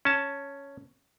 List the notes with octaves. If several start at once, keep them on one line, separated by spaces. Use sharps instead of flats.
C#4 A5